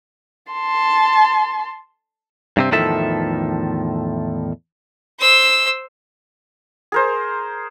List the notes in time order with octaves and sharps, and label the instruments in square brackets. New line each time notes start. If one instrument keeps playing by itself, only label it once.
[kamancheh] A5 C6
[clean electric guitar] G2 C3 C4
E2 A2 D#3 F3 A4 E5
[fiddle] C5 E6
[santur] G#4 A#4 C5